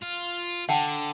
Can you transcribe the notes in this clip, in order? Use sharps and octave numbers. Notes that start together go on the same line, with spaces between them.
F4
D3 F#5 G5 A5